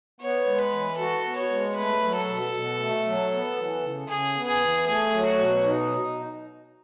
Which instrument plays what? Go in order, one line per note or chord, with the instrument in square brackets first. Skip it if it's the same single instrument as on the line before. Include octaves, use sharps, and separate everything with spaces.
[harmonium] B3 [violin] C#5
[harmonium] G#3
[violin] B4
[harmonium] E3
[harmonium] F#4 [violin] A4
[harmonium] B3
[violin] C#5
[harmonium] G#3
[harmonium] A3 [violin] B4
[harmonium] F#3
[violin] A4
[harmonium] B2
B2
A3
F#3
B3
E3
C#3
[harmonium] C#3 [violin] G#4
[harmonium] B3
[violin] G#4
[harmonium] E3
[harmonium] A3 [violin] G#4
[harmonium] F#3
[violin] F#4
[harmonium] B2
D#4